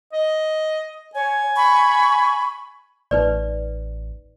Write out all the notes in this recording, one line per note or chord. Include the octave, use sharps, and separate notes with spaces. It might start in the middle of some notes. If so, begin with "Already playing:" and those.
D#5
C#5 G#5
B5 C#6
A1 D#4 B4 D5